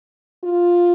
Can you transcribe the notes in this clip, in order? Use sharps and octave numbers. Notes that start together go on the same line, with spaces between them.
F4